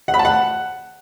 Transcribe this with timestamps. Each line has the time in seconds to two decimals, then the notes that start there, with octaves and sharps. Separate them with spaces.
0.08 F#5
0.14 B5
0.19 A5
0.25 F#5